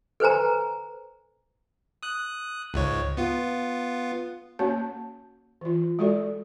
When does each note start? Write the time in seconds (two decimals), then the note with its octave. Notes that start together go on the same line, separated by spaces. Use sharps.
0.20 A4 B4 C5 G#5 A#5
2.03 D#6 F#6
2.74 C#2 G#2 C#5
3.17 B3 F4
4.59 A#3 C#4 F#4 C#5 A5
5.61 E3 F4
5.99 G#3 F#4 A4 D5